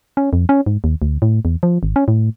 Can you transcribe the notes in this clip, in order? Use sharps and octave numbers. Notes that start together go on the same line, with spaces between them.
C#4
F2
C#4
G#2
D#2
D2
A2
E2
F3
G#1
C#4
A2